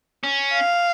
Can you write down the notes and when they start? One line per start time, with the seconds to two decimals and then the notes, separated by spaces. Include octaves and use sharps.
0.23 C#4
0.53 F5